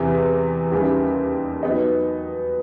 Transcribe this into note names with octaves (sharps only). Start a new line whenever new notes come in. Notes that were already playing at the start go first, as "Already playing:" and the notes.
Already playing: E2 C3 E3
D#2 C#3 E3 G3
F#3 B3 D#4